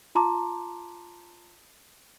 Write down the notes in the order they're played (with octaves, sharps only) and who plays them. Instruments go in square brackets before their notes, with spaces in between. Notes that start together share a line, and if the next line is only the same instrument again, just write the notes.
[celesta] F4 A5 A#5 C6 D6